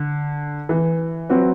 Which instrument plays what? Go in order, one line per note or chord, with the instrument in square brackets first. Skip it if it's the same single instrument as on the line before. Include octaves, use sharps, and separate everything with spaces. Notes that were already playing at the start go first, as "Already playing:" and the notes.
Already playing: [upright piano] D3
E3
[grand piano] F#3 C4 F#4 B4